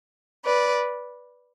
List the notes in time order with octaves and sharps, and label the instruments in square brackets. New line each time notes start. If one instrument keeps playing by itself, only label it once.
[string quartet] B4 D5